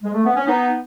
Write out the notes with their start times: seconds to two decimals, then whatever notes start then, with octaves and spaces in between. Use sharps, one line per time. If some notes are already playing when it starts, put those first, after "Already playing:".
0.03 G#3
0.13 A3
0.25 B3
0.35 C#4
0.47 B3 D#4